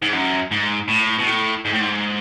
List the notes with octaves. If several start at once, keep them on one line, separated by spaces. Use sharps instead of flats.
G#2
F#2
G#2
A2
B2
A2
G#2
A2
G#2